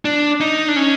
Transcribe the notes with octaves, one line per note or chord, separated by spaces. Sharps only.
D4
D#4
D4
C#4